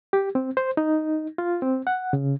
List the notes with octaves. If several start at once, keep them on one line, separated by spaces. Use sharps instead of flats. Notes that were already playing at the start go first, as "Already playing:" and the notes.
G4
C4
C5
D#4
F4
C4
F#5
C#3